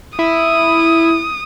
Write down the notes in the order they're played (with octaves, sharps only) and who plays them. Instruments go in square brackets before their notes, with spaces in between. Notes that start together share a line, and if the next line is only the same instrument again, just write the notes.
[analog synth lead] E4 [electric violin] D#6